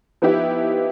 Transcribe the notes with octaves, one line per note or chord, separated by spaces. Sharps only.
F3 B3 D#4 E4 G4